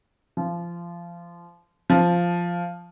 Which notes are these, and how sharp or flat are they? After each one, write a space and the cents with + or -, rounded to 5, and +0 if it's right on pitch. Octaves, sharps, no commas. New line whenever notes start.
F3 -25
F3 -5